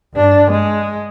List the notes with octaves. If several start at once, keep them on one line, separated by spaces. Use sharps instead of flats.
G2 D4
G#3